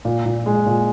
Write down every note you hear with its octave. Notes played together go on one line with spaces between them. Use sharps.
A#2
A#2
G#3
A#2